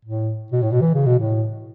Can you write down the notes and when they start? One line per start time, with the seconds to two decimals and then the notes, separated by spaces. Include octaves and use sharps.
0.05 A2
0.52 B2
0.62 A2
0.72 B2
0.81 E3
0.94 C#3
1.06 B2
1.18 A2